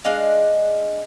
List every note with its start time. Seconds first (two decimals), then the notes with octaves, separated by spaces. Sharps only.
0.04 G#3 D4 D#5 F5